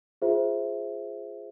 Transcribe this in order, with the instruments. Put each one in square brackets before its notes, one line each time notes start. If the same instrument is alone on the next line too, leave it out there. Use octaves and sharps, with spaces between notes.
[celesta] F4 G#4 C5 E5